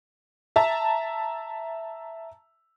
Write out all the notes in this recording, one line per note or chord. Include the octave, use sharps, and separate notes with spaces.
E5 A5 A#5